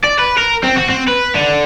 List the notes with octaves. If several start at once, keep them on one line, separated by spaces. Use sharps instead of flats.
D5
B4
A#4
C4
F#4
C4
B4
D3